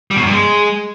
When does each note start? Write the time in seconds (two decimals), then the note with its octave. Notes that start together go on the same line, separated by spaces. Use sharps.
0.11 G3
0.16 B2
0.21 F#2
0.26 G2
0.32 G#3